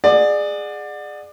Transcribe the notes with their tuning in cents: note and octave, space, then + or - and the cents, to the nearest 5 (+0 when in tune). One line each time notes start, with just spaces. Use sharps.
G#4 +0 D5 +25 F#5 -20